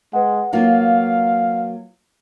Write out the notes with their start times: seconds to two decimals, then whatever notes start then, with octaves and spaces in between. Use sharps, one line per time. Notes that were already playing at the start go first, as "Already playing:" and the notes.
0.13 G#3 B4 F#5
0.53 F#3 A#3 F4 F5